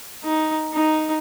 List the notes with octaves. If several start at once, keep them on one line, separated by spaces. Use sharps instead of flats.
D#4
D#4